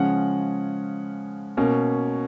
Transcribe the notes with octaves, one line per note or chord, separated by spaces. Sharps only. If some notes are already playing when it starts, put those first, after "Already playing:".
Already playing: C#3 F3 G#3 C#4 F#5
B2 A#3 C#4